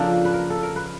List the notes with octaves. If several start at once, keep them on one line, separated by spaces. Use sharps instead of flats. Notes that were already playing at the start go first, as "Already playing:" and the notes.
Already playing: C#3 F3 A#3 D4 A4
B4
A#4
A4
A#4
B4